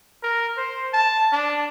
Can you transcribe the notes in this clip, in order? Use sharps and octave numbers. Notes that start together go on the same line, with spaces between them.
A#4
C5
A5
D4